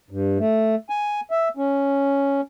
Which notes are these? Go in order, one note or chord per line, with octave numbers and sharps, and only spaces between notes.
G2
A3
G#5
E5
C#4